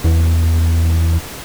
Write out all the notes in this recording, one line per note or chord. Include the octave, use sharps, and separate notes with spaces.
E2